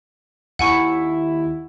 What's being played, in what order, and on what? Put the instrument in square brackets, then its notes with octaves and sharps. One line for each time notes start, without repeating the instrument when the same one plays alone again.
[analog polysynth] D#2 E4 [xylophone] F#5 G#5 C#6